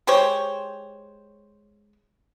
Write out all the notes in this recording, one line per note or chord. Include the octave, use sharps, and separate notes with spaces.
G#3 G4 C5 C#5